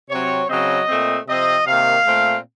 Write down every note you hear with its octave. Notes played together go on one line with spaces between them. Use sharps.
C3 F#3 C4 C#5
C#3 F#3 C4 D#5
A#2 A3 C4
C3 F3 C4 D#5
C3 D#3 A#3 F5
A#2 A3 C4